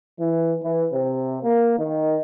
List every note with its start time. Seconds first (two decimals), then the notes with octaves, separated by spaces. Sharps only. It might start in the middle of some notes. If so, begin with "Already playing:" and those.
0.17 E3
0.63 E3
0.92 C3
1.42 A#3
1.78 D#3